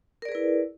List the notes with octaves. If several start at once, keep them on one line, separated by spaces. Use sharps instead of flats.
E4 G#4 A#4 B4 D5